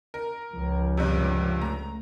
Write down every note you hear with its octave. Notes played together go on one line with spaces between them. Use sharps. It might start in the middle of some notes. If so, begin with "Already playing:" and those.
A#4
C#2 F3
A#1 G2 C3
A3 A#5